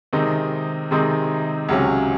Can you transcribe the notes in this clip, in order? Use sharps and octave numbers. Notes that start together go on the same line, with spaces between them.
C3 D#3 G#3 C4 D#4
C3 D#3 G#3 C4 D#4
C#2 C3 F#3 C#4